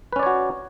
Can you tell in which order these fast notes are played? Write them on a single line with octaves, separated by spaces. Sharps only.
B4 C#4 D5 C#5 F#4